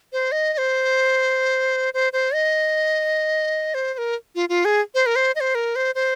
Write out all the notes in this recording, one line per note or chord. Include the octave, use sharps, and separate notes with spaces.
C5
D#5
D#5
C5
C5
C5
D#5
C5
C5
A#4
F4
F4
G#4
C5
A#4
C5
D#5
C5
A#4
C5
C5